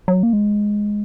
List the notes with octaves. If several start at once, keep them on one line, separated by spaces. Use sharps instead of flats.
F#3
A#3
G#3